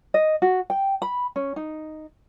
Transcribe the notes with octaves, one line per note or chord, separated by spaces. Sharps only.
D#5
F#4
G5
B5
C#4
D#4